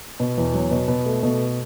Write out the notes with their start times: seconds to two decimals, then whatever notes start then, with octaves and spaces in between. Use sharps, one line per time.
0.20 B2
0.38 E2
0.54 F#3
0.71 B2
0.88 B2
1.06 A3
1.23 B2